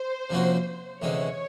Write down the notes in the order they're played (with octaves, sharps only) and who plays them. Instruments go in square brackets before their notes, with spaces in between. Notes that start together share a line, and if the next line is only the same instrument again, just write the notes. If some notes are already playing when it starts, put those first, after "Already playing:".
Already playing: [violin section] C5
[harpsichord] C3 F3 A#3 C#4 F#4
[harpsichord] D2 C3 E3 G#3 C#4 [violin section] C#5